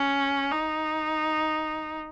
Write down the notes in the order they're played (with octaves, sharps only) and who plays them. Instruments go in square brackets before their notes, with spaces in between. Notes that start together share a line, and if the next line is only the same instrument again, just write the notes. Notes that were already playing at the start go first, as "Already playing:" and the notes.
Already playing: [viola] C#4
D#4